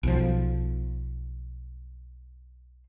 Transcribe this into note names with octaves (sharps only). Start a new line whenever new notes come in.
B1 F3